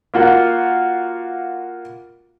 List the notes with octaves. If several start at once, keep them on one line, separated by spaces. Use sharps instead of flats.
A#3 F4 F#4 A#4